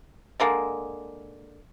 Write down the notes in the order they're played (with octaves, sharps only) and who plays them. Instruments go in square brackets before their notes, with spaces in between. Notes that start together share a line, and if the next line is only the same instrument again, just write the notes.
[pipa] D3 G#3 A#3